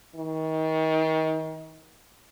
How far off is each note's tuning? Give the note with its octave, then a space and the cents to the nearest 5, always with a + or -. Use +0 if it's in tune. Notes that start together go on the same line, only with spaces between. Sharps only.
D#3 +35